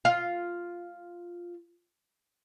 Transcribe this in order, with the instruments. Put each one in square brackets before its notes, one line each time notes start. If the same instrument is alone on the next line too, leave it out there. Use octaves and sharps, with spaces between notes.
[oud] F4 F5